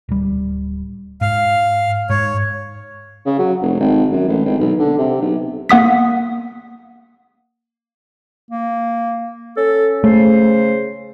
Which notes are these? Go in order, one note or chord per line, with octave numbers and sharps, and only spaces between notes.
D1 G3
G#2 F5
G#2 C#5
C#3
F#3
F1
G#1
F#2
A1
G#1
B1
D3
C3
B1
A#3 F#5 D#6 B6
A#3
C#4 A4
C#3 A3 C5